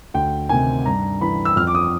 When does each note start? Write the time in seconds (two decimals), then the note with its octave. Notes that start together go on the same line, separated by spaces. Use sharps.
0.14 D2 G5
0.49 C3 D#3 G#5
0.86 G2 A#5
1.21 E3 B5
1.45 E6
1.56 F2 F6
1.67 D6
1.75 D#6